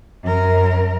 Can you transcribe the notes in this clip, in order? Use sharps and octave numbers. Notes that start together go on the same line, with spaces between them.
F#2 A#4